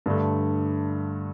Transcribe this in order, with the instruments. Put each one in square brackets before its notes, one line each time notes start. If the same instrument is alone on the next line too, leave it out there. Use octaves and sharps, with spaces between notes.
[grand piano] G2 D3 A3